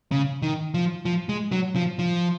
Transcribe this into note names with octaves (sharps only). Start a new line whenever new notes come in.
C#3
D#3
F3
F3
G#3
F#3
F3
F3